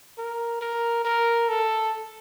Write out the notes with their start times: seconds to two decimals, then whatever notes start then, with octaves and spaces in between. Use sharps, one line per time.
0.18 A#4
0.61 A#4
1.05 A#4
1.49 A4